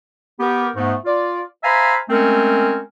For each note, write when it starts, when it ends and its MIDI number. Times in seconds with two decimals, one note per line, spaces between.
0.40 0.68 59
0.40 0.68 67
0.40 0.68 70
0.76 0.94 44
0.76 0.94 57
0.76 0.94 59
1.05 1.41 65
1.05 1.41 74
1.64 1.97 72
1.64 1.97 76
1.64 1.97 77
1.64 1.97 80
1.64 1.97 82
1.64 1.97 83
2.09 2.81 56
2.09 2.81 57
2.09 2.81 60
2.09 2.81 61
2.09 2.81 70